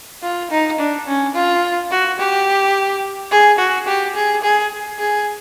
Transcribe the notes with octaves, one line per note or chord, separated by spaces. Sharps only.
F4
D#4
D4
C#4
F4
F#4
G4
G#4
F#4
G4
G#4
G#4
G#4